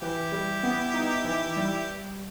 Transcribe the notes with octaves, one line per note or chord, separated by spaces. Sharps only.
E3 E4 G4
G3
B3
D#4
E3
G3